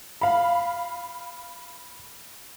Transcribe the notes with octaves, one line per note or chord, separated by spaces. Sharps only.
F5 B5